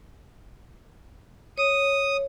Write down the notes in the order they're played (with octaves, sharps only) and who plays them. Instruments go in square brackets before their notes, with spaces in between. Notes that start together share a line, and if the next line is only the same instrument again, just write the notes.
[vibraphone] C#5 [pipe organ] D#6